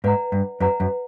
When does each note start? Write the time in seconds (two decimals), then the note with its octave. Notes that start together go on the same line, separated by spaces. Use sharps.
0.04 G#2 B4 D5 F#5 A#5
0.32 G2
0.60 F#2 B4 D5 F#5 A#5
0.80 F#2